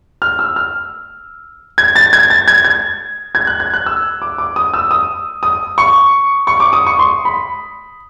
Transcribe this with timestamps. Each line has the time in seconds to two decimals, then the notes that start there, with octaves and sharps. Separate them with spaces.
0.22 F6
0.39 E6
0.56 F6
1.78 G#6
1.96 A6
2.13 G#6
2.30 A6
2.48 G#6
2.65 G#6
3.35 G#6
3.47 F#6
3.60 G#6
3.73 F#6
3.86 E6
4.22 D6
4.38 D6
4.56 D#6
4.74 E6
4.91 D#6
5.43 D#6
5.78 C#6
6.47 C#6
6.60 D6
6.73 D#6
6.87 C#6
6.99 C6
7.25 B5